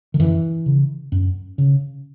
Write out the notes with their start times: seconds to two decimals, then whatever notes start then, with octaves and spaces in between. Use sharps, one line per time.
0.14 D#3
0.19 F#2 E3
0.66 C#3
1.12 F#2
1.58 C#3